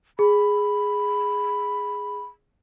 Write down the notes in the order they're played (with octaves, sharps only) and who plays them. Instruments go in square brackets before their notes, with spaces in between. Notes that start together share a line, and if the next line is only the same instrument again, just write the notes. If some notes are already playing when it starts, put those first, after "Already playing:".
[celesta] G#4 [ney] B5